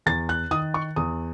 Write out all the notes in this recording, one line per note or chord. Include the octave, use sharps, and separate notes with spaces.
E2 A6
F#6
D#3 D#6
C#6
E2 D#6